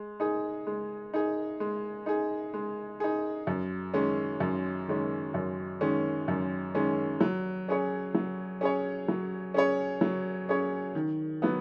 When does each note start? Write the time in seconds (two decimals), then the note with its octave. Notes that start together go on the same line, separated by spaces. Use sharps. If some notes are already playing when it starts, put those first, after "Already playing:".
Already playing: G#3
0.20 D#4 G#4
0.67 G#3
1.14 D#4 G#4
1.60 G#3
2.06 D#4 G#4
2.54 G#3
3.00 D#4 G#4
3.47 F#2
3.94 D#3 G#3 C#4
4.40 F#2
4.88 D#3 G#3 C#4
5.34 F#2
5.81 D#3 G#3 C#4
6.28 F#2
6.75 D#3 G#3 C#4
7.20 F#3
7.68 C#4 G#4 C#5
8.14 F#3
8.61 C#4 G#4 C#5
9.08 F#3
9.54 C#4 G#4 C#5
10.01 F#3
10.49 C#4 G#4 C#5
10.95 D#3
11.42 F#3 B3